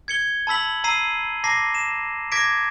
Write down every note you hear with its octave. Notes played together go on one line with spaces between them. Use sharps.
G#6 C#7 G7
A5 B5 E6 B6 F#7
A#5 E6 C7 D#7
A5 A#5 D6 A#6 C7
E7
D6 G#6 A#6 B6 D7